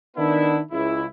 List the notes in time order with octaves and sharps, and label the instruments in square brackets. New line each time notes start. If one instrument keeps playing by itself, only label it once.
[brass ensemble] D#3 B3 D4 E4
C#2 E4